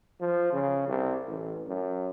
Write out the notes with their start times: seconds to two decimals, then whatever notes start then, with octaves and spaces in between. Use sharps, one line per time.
0.20 F3
0.53 C#3
0.88 C2
1.28 A1
1.67 F#2